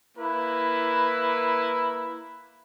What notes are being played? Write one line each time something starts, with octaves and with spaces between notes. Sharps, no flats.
A#3 E4 B4